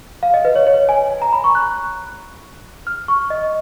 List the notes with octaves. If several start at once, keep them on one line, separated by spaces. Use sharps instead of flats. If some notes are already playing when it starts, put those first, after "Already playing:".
F5
D#5
B4
C#5
C#5
G#5
G#5
A#5
B5
C#6
F#6
F6
C#6
D#5